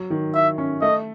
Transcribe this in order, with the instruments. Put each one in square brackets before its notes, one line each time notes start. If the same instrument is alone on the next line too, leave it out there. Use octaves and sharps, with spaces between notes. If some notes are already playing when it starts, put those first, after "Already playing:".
Already playing: [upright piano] F#3
D#3
[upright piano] E4 [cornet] E5
[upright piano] C#4
[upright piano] A3 [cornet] D#5